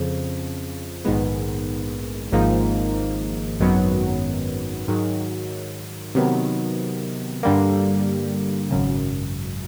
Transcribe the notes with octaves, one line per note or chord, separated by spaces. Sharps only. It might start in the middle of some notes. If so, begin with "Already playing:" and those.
Already playing: F2 C#3 F3
A#1 G#2 D#3 G#3 B3
G#1 G#2 F3 A#3 D#4
G#1 F#2 D#3 F#3 B3
G#2 D#3 F#3
C3 D#3 F#3 B3
G2 D3 G3 A#3
G#1 F#2 C#3